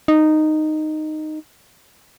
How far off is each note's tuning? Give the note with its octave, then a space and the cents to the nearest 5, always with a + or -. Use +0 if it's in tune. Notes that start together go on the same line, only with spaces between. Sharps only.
D#4 -10